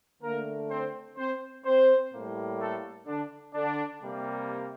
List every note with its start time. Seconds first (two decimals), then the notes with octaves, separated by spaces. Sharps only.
0.22 D3 A3 A#3 A#4
0.70 C4 C5
1.17 C4 C5
1.65 C4 C5
2.12 A2 G3 A#3
2.59 A3 A4
3.07 D3 D4
3.54 D3 D4
4.02 C3 G3 A#3